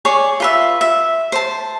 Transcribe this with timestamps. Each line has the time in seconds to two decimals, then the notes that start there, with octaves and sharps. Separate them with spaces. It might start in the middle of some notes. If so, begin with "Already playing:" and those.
0.05 G#4 C#5 D5 C#6
0.40 F4 B4 E5
0.81 E5
1.32 C5 A5